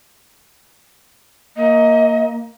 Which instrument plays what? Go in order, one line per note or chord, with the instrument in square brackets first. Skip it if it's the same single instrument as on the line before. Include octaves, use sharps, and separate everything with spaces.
[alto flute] A#3 [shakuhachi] D#5